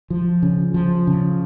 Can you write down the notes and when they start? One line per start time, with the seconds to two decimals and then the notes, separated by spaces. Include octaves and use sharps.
0.10 F3
0.43 C#3
0.74 F3
1.07 C#3